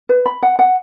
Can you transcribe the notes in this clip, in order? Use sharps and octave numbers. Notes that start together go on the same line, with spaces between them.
B4
B5
F#5
F#5